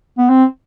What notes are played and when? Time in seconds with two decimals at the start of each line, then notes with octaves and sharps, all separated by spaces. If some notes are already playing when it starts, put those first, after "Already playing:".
0.18 B3
0.29 C4